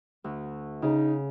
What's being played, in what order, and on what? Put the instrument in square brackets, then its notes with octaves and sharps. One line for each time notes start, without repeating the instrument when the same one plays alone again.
[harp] D2
[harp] C#3 G#4 [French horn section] D#4